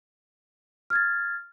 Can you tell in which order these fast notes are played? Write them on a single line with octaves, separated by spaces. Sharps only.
F6 G#6 A6